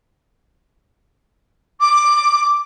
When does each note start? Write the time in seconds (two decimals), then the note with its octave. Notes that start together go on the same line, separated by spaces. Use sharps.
1.80 D6